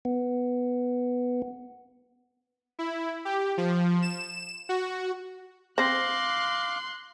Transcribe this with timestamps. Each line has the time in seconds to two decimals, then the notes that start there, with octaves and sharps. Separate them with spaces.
0.05 B3
2.79 E4
3.25 G4
3.57 F3
4.02 E7
4.69 F#4
5.78 C4 C5 F5 C6 D6 F#6 A#6 C7